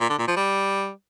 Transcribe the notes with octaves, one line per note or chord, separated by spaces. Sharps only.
A#2
D3
A#2
F3
G3